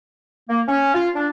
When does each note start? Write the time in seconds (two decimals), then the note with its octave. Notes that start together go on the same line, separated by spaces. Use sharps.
0.49 A#3
0.68 C#4
0.94 F4
1.16 D4